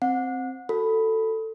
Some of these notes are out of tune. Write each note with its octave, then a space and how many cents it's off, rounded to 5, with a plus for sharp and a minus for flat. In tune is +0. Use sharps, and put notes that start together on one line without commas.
C4 +0 F#5 -30
F#4 +0 A4 +15 B5 +0